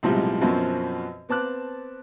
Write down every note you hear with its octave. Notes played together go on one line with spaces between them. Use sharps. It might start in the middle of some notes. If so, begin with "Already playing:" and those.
B1 A2 C3 F3 G3 G#3
F#2 B2 F3 C4 C#4 F#4
B3 C4 A5 D6 F#6